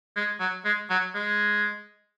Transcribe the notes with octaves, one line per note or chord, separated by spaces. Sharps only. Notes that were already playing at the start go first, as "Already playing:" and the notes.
G#3
F#3
G#3
F#3
G#3